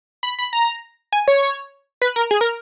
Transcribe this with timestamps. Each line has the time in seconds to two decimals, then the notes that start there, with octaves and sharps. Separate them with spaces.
0.23 B5
0.39 B5
0.53 A#5
1.12 G#5
1.28 C#5
2.02 B4
2.16 A#4
2.31 G#4
2.41 A#4